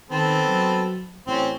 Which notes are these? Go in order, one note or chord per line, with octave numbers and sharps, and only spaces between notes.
D#3 B3 C4 A4
F#3
A1 C4 C#4